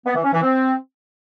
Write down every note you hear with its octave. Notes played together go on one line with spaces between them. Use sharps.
B3
E3
C#4
E3
C4